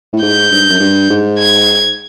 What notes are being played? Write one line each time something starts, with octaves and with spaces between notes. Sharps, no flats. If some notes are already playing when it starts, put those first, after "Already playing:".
A2
G#2 G6
G2
F#2
G2
G#2
G#6